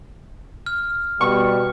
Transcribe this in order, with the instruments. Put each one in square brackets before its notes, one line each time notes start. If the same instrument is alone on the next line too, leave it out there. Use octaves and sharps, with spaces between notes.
[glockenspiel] F6
[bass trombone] B2 [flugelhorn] G3 [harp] C#6